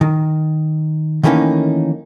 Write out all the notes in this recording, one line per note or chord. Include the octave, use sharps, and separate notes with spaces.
D#3
D#3 E3 A3 A#3 C#4 D#4